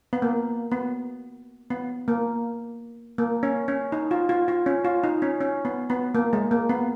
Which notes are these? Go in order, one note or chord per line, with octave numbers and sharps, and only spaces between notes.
B3
A#3
B3
B3
A#3
A#3
C#4
C#4
D#4
F4
F4
F4
C#4
F4
D#4
C#4
C#4
B3
B3
A#3
G#3
A#3
B3